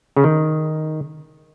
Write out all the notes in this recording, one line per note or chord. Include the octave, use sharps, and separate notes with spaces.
C#3
D#3